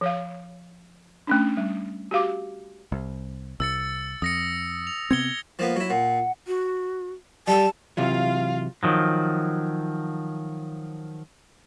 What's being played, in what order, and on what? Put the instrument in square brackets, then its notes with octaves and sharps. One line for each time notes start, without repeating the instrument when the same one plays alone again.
[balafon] F3 C#5 F5
A3 C#4 D4
G3
F#4 G4 F5 D6
[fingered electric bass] C2
[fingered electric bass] C2 [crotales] E6 A6 C#7
[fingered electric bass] F2 [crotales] D#6 A#6 C#7
[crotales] F7
[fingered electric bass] C3 B3 C4 [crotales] G#6 C#7 G7
[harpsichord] F3 A#3 B3
F#3 E4
[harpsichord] A#2 [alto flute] F#5
[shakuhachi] F#4
[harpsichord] G3 [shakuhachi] A5
[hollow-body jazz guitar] C3 E3 F#3 [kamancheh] F4 F5
[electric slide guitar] D#3 F3 F#3